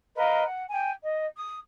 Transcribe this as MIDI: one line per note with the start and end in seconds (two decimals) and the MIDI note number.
0.16 0.42 70
0.16 0.42 71
0.16 0.42 75
0.16 0.42 77
0.43 0.63 78
0.69 0.90 79
0.69 0.90 80
1.03 1.24 75
1.35 1.57 87